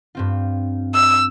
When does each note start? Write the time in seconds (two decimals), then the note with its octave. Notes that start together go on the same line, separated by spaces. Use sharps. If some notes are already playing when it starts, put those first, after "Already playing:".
0.15 G2 C4 F4
0.95 E6